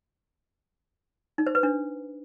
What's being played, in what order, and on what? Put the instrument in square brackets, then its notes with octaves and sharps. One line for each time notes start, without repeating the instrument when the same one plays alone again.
[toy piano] D#4
C5
B4
D4